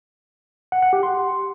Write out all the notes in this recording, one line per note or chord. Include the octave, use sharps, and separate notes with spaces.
F#5
F#5
G4
C6